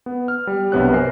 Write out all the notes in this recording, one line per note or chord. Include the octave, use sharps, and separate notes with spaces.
B3
F6
G3
B1 G2 C3 B3 C#5 F#6
A#4 C5 G#5 C7